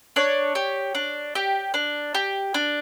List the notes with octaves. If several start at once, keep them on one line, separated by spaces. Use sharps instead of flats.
D4 C#5
G4
D4
G4
D4
G4
D4